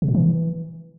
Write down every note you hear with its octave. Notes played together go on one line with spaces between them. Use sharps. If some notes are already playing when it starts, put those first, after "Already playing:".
C3
A#2
E3